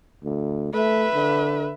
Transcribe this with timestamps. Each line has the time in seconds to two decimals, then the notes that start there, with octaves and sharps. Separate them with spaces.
0.24 D2
0.73 A3 B4 E5
1.15 D3